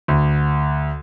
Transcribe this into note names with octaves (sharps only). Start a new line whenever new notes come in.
D2